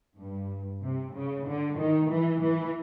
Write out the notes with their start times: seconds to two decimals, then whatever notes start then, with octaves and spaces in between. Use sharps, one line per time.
0.17 G2
0.81 C3
1.14 C#3
1.46 D3
1.78 D#3
2.10 E3
2.42 E3